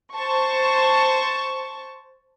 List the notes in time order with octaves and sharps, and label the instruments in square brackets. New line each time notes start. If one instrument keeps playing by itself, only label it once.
[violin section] C5 A5 C#6